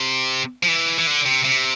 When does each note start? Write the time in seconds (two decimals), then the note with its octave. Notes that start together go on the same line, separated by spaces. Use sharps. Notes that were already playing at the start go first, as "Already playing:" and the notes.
Already playing: C3
0.63 F3
0.68 E3
0.99 E3
1.07 D3
1.26 C3
1.45 C3